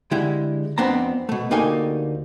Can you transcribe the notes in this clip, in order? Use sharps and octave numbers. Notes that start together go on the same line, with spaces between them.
D3 G#3 E4 G4
F2 B3 C4 D4 A#5
B2 A3
D2 A#3 D#4 G4 A4 G#5